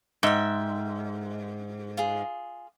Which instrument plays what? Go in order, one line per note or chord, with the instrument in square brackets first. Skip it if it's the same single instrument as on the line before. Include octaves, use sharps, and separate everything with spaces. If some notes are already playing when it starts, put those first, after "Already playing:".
[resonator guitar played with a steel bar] G#2 [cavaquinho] E5 G5
[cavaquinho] F4 G#4